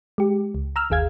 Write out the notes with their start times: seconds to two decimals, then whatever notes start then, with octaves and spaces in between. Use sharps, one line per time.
0.18 G#3 G4
0.55 C#2
0.76 A#5 E6 F6
0.90 G1 D#2 G#4 F5 G#6